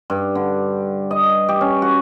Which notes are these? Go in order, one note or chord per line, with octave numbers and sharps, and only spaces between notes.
G2
D3
D#5
G4
C#4
F#4